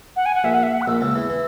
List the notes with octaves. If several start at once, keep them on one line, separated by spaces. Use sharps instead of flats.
F#5
G#5
F#5
A#1 A#2 E5
F#5
E5
F#5
F#6
A#1 A#2 E6
C#2 C#3 E6
E2 E3
E3